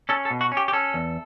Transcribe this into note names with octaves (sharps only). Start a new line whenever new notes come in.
C#4 A4
A4
B2
F#4
C#4
G4
G4
C#4 A4
E2